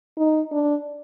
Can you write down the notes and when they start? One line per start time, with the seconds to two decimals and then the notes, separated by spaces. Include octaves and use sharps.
0.17 D#4
0.52 D4